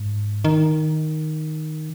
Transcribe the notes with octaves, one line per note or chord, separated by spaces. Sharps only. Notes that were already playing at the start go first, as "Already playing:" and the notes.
Already playing: G#2
D#3